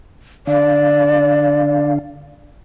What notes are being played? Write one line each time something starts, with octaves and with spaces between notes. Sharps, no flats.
D3 D4 D5 F5